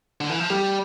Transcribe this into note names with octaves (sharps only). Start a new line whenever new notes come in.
D3
E3
F3
G3 G4